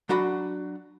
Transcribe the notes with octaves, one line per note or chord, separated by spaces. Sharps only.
F#3 D4 F#4 B5